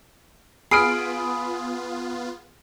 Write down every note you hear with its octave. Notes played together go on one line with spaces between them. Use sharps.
B3 F4 G#4 B5 D#6 F6 C7 D7